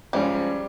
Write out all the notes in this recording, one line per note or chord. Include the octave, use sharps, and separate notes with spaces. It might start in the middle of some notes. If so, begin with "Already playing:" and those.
G#2 F3 G3 G#3 C#4